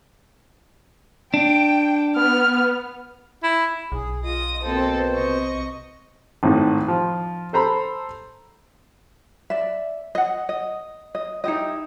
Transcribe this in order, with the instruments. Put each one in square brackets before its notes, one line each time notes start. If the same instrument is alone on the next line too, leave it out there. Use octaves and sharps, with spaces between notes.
[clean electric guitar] D4 [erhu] G5
[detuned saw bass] B3 [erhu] F6
[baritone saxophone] E4
[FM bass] B1 [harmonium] G#4
[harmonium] F4 [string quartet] D#5 D#6
[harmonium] B2 C5 [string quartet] A#3 C4 A4
[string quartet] C3 D#5 C#6
[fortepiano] G#1 A2 D#4
F3
A4 C5 A#5 B5
[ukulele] D5 E5
D#5 F#5
D#5
D#5
D#4 E4 G4 D#5